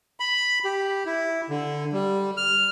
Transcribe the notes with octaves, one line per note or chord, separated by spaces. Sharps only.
B5
G4
E4
D3
G3
F6